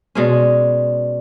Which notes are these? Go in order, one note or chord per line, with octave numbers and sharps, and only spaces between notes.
B2 G#3 C#4 D5 C6